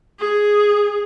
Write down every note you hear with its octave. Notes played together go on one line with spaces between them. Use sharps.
G#4